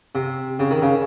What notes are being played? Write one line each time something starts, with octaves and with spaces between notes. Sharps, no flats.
C3
C#3
D#3
C#3